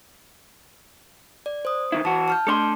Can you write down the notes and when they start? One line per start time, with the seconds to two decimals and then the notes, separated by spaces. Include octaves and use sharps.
1.46 D5
1.65 C5 D#6
1.92 D#3 F#3 E4
2.05 E3 F#4 A5
2.28 A5 F6 G6
2.47 A3 D4 A4 C#5 C6 D6